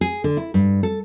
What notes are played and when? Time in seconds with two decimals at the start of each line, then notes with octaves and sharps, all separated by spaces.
0.01 G#4
0.24 D3
0.37 E4
0.54 G2
0.83 A4